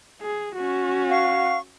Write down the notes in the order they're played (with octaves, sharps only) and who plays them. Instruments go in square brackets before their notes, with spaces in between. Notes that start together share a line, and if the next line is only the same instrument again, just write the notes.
[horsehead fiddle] G#4
C#4 F#4
[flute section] F5 F#5 C#6